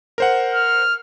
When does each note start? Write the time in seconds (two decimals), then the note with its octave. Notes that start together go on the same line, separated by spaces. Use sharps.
0.18 A#4 C5 F#5
0.54 F6